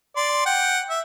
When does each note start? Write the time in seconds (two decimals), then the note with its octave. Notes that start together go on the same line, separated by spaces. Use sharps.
0.17 D5 C6
0.46 F#5 G5
0.90 E5